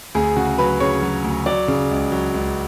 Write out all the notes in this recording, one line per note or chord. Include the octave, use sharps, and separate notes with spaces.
D2 G#4
C#3 F#4
F#3 B4
C#3 C#5
F#3
D2
F#3 D5
C#3
C#2
F#3
C#2